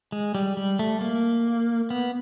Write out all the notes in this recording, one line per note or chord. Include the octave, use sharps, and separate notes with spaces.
G#3
G3
G3
A3
A#3
B3